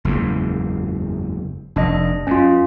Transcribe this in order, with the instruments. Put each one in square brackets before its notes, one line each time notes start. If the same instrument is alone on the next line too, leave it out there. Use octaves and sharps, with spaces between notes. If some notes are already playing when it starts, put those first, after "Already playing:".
[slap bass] F#1 E2 G#2
[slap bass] F1 [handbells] D4 D#5
[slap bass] F#2 [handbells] C#4 F4